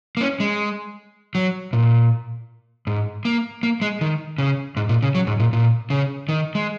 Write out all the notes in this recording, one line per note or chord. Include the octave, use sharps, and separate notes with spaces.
A#3
C#4
G#3
F#3
A#2
G#2
A#3
A#3
G#3
D#3
C#3
G#2
A#2
C#3
F#3
G#2
A#2
A#2
C#3
D#3
G#3